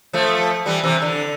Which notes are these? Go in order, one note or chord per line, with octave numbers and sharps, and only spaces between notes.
F3 A3
E3 G3
C3 E3
D3